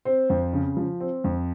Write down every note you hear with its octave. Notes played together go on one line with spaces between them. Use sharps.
C4 C5
F2
C#3
F3
C4
F2